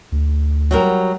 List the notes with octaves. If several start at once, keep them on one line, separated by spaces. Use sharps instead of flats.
D2
F#3 G3 A#4